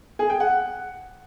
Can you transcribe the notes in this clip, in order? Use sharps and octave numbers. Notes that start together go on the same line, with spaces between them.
G#4
G5
F#5